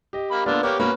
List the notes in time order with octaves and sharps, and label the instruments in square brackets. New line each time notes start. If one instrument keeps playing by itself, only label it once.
[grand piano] G4 D#5
[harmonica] A#3 B5
[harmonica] D3 D4 F4 [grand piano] A#3 B3 D5
[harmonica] A#3 B3 G4 [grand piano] C#5
[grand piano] A#3 B3 F#4 [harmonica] C#4 B4